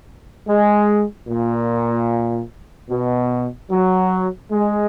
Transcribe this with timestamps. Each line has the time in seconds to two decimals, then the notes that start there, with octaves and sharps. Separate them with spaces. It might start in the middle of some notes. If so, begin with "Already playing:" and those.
0.47 G#3
1.28 A#2
2.89 B2
3.70 F#3
4.50 G#3